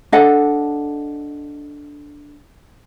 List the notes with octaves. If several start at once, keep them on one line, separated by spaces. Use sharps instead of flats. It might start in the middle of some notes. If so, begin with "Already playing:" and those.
D4 A4 D#5 F#5